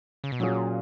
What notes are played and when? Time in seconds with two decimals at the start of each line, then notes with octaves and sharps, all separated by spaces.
0.24 C#3
0.32 B2
0.40 A#2 F#3 C#4 F4 G#4